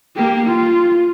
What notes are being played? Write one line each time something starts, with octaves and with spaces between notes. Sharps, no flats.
A#3 G4
F4